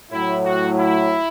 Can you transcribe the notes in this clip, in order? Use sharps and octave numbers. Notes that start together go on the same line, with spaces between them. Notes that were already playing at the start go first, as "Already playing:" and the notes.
A2 F#3 E4
F#4
E4